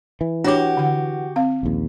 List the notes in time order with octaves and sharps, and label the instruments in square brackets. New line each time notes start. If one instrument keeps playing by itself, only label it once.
[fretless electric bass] E3
[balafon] D4 C#5 D6 [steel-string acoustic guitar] F#4 G4
[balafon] D3 F#5
C4 F5
[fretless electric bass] A#1 D#2